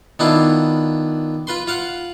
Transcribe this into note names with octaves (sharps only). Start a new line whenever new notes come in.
D#3 B3 D4 E4 F4
F4 B4 C6
F4 F5 F#5